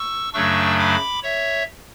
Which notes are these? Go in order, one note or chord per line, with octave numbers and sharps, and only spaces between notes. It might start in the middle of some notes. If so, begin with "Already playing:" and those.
Already playing: C#6 E6
F#2 C#3 F#3 A3 D4 C#6 E6
B5 D6
C#5 E5